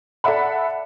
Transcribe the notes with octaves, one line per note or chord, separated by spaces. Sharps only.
A4 D5 E5 F#5 B5